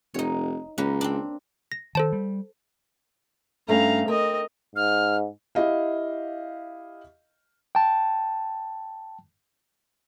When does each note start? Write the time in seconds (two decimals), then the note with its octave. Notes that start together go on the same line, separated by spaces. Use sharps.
0.14 F1 D#4 C#5
0.78 C#2 A#3 C#4 B4
1.01 C4 D4
1.72 A#6
1.95 D#3 A4 C5 A5
2.12 G3
3.68 G2 A3 C#4 F5 A#5
4.08 C4 A#4 D#5
4.76 G#2 F6
5.55 E4 G4 D#5 F5
7.75 G5 A5